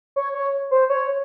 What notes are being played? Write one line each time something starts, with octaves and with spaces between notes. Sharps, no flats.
C#5
C#5
C5
C#5